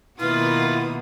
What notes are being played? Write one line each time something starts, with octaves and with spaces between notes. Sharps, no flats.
B2 D#3 A#3 E4 F4 B4 D#6